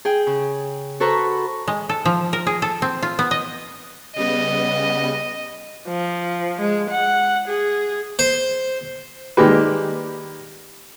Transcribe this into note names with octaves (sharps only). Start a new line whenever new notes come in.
G#4 G5
C#3
F#4 A4 B4 C5 A#5 C#6
G#3
A4
F3
A#4
G#4
A4
C4
F4
B3
D#5
C#3 G3 B3 D#5
F3
G#3
F#5
G#4
C5
D#3 G3 G#3 A#3 G4 B4